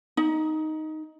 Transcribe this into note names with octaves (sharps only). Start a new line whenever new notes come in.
D#4